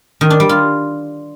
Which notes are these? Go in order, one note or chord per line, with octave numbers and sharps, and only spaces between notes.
D#3
D4
G3
F4